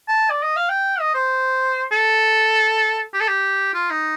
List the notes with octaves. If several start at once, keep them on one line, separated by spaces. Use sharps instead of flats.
A5
D5
D#5
F5
G5
D#5
C5
A4
G4
A4
G4
F4
D#4